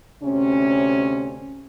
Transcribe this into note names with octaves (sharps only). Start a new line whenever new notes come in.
D2 C3 C#4